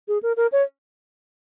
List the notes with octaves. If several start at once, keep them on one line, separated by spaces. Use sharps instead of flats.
G#4
A#4
A#4
C#5